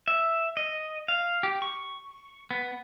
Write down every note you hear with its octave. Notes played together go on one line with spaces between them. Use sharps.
E5
D#5
F5
G4
C#6
B3